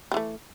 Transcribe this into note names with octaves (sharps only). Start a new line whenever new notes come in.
E3 G3 A3